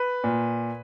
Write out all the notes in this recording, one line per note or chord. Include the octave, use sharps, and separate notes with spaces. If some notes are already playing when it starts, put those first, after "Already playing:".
Already playing: B4
A#2